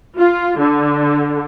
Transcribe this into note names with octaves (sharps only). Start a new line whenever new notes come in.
F4
D3